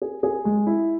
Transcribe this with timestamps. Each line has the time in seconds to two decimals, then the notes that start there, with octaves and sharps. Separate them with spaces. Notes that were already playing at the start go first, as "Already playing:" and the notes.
0.02 G#4
0.23 G#4
0.45 G#3
0.67 E4